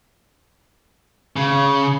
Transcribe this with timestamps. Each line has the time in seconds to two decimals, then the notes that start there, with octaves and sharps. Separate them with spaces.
1.36 C#3